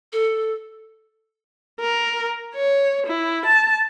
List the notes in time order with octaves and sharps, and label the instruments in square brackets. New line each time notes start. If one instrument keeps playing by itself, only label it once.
[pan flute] A4
[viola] A#4
C#5
E4
A5